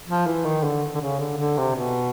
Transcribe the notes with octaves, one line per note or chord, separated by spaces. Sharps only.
F3
E3
D#3
D3
D3
C#3
D3
D3
C3
B2